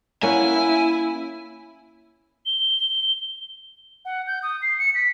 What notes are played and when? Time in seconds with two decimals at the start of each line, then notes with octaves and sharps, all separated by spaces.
0.23 A#3 C#4 E4 F#5 G#5
2.46 G7
4.05 F#5
4.27 G6
4.43 D#6
4.62 C7
4.78 C#7
4.95 B6